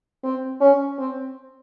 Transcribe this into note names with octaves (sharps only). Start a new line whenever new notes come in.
C4
C#4
C4